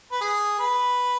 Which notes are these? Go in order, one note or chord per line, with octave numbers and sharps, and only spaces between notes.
B4
G#4
B4